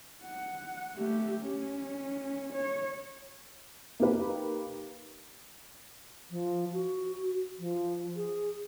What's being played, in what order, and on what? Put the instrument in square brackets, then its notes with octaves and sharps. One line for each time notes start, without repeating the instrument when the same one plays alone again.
[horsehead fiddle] F#5
A3 G4
C#4
C#5
[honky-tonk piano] A#3 D#4 G4 B4
[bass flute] F3
F#4
F3
G#4